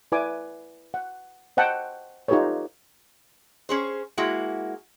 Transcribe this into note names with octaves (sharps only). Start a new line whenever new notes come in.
E4 B4 D5 G#5 D6
F#5
C5 D#5 F#5 G5 A5
D#4 F4 G4 A4 B4 C#5
C#4 G#4 C5
G#3 A#3 E4 F#4